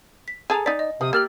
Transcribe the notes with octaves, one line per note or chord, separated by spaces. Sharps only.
B6
G#4 A4 G#5 A#5
D#4 D5 B6
D#5
C3 F3 D#6
A#3 G4 E6 F6 A6 F#7